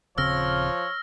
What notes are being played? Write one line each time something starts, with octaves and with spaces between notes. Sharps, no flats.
D#1 C#3 F3 C4 C#5 E6 F6 A#6